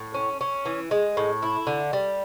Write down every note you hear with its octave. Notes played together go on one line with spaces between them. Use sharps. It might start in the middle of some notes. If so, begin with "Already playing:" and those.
Already playing: A2
C#4
C#4
E3
G#3
A2
E4
D3
G3